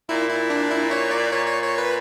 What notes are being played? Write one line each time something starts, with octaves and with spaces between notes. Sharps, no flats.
A#2 E4
E4
D4
E4
C#5
D5
A#2 C#5
C#5
C#5
B4